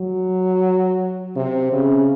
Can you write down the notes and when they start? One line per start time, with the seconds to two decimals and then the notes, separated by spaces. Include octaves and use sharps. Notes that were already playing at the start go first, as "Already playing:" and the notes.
Already playing: F#3
1.36 C3
1.72 C#3